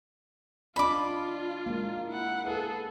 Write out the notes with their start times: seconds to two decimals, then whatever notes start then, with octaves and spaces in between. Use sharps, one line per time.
0.76 D4 F4 D5 D#5 B5 D6
1.66 G#3 A#3
2.08 E4 F#5
2.46 G#4 A4 B4